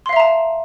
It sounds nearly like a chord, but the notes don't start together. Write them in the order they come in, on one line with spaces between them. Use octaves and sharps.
C6 F5 E5 A#5 A5